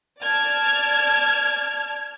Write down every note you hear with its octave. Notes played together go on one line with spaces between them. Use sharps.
D5 A5 F6 G#6